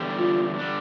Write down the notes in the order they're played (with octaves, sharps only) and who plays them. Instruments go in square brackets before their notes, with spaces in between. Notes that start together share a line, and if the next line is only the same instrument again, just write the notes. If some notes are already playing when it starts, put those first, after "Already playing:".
Already playing: [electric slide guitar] E2 D3 G3
[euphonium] F4
[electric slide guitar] D3 G3 D4